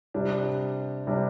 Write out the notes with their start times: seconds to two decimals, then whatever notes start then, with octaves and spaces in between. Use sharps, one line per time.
0.14 C3 G3 D4
1.07 C3 G3 D4